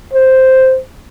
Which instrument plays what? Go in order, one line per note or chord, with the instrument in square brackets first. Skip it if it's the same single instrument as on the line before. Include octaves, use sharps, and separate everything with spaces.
[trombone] C5